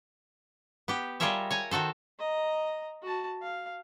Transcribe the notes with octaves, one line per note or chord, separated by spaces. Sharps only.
B3 G4
G3 F4 G#4 A#4 C#5 E5
C#5 G#5 A#5
D#3 F#4 A4 C5
D#5 A#5
F#4 A5
F5